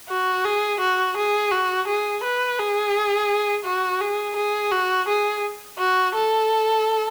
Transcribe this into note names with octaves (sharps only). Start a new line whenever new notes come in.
F#4
G#4
F#4
G#4
F#4
G#4
B4
G#4
F#4
G#4
G#4
F#4
G#4
F#4
A4